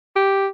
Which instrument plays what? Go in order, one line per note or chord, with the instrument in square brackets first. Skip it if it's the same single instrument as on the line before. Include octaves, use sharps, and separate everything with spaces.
[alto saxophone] G4